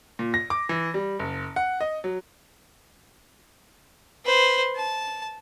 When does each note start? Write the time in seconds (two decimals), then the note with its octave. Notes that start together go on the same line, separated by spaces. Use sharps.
0.19 A#2
0.34 A#6
0.50 D6
0.69 E3
0.94 G3
1.19 F#1
1.56 F#5
1.81 D#5
2.04 F#3
4.25 B4 C5
4.75 A5